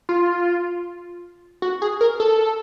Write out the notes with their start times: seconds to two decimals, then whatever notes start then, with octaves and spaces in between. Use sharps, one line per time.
0.09 F4
1.62 F#4
1.82 G#4
2.01 A#4
2.20 A4